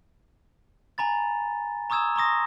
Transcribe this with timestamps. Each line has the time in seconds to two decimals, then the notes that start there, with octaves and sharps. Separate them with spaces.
0.98 G#5 A#5 B5 A6
1.90 A#5 C#6 D#6 E6 G#6 E7
2.16 A#5 C6 C#6 D#6 A#6